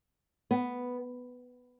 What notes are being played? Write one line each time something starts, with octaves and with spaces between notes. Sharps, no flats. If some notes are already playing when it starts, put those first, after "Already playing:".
B3